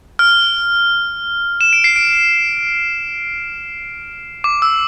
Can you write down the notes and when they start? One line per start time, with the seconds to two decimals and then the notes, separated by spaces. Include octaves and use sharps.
0.19 F6
1.61 E7
1.73 D7
1.84 C7
1.96 D7
4.44 D6
4.62 E6